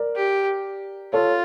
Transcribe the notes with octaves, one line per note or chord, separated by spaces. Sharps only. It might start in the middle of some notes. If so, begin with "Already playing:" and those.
Already playing: A#4 D5
G4
F4 A4 C#5